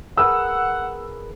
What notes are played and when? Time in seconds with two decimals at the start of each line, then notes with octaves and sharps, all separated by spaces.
0.17 G#4 A#4 B4 F#5 E6